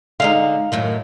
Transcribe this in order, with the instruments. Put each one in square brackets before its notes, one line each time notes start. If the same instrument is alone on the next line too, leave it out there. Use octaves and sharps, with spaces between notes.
[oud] D3 G#3 D#4 [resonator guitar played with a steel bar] F5
[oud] F#2 A2 D#3